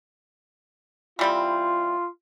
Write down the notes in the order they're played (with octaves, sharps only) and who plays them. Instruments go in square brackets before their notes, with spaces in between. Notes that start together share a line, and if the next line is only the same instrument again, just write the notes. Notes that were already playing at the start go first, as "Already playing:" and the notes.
[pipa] E3 G3 C4 [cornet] F4